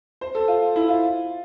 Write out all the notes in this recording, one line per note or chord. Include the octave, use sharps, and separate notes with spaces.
C5
A4
F4
E4
F4